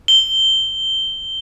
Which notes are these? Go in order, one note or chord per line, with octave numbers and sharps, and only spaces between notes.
G7